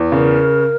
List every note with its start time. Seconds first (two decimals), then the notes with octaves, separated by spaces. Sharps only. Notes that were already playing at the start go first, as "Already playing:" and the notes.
Already playing: E2
0.12 C#3 A#4